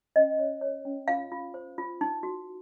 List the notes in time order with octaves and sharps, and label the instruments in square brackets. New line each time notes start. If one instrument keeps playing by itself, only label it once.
[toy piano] C#4 D#5
C#5
C#5
C#4
F4 F5
F4
C5
F4
D#4
F#4